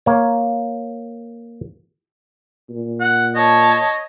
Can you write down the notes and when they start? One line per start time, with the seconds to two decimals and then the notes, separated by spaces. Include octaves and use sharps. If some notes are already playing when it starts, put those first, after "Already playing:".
0.06 A#3 C#5
2.70 A#2
3.00 F#5
3.36 C#5 D#5 A5